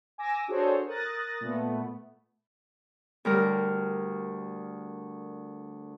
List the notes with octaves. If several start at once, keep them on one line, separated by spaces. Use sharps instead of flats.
G#5 D6 E6 A#6
D4 F#4 G#4 A4 C5 C#5
A#4 D#6 F#6 A6 A#6
A#2 A3 B3
D2 G3 A#4